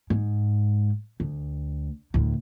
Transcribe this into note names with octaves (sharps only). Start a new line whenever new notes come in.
G#2
D2
D2 A2